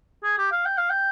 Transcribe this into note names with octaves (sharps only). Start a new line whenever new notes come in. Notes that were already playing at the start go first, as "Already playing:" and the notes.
G#4
G4
F5
G5
F5
G5